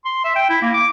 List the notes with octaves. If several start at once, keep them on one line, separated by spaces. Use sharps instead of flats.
C6
E5
G5
E4
A#3
D6